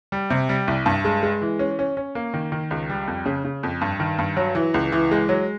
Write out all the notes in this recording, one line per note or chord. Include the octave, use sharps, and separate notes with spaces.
G3
C3
G3
C2
G2
G#3
G#3
E3
C#4
C#4
C#4
A#3
D#3
D#3
C#2
G3
F2
C#3
C#3
F2
G2
D#3
G2
F#3
E3
C#2
E3
G#3
F#3